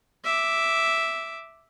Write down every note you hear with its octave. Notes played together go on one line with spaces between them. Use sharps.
E5 D6